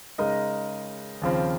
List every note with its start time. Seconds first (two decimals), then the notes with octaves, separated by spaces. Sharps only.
0.18 C#3 G#3 D#4 A#4 D#5
1.22 D#2 C#3 F3 C4 F4